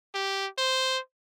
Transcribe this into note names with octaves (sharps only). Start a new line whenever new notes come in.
G4
C5